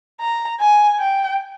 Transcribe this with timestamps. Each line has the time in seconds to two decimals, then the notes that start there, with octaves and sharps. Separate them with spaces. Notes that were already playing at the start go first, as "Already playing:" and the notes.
0.21 A#5
0.60 G#5
1.00 G5